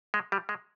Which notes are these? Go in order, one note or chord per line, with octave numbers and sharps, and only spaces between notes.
G#3
G3
G#3